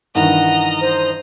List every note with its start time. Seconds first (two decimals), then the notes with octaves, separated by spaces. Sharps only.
0.15 G2 D#3 E3 D#5 F#5 A#5
0.80 C5